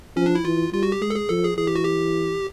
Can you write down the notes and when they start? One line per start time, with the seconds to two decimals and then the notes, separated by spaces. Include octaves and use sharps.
0.16 F3 C#4
0.26 D4
0.35 E4
0.45 E3 F4
0.73 G3 F4
0.83 F#4
0.92 G4
1.01 G#3 G#4
1.10 A4
1.16 G#4
1.30 F3 A4
1.44 G#4
1.58 E3 G#4
1.67 G4
1.76 F#4
1.85 G4